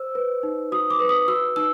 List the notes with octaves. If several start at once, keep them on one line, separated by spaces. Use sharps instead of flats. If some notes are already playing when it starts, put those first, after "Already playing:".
Already playing: C5 E6
B4
D#4
F#4 D#6
D6
B4
D#6
F#4 E6
D#4 E6